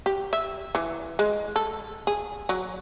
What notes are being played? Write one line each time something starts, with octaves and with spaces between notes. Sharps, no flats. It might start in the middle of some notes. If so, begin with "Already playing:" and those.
G4
E5
E3
G#3
A4
G#4
F#3